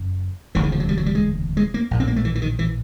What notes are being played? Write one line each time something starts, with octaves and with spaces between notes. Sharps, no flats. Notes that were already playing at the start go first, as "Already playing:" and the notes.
Already playing: F#1 F#2
E1 D2 C#3 E3
D#3
F3
F#3
G3
F#3
G3
G#3
G#3
A#3
A#1 A2
C4
A#3
A3
E3
E3
D#3
E3